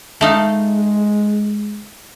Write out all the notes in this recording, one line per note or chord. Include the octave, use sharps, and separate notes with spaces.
G#3 A3 D#4 F5